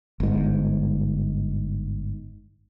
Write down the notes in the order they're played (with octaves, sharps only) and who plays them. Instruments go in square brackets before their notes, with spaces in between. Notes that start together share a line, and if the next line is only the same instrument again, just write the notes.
[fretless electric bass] G1 G#2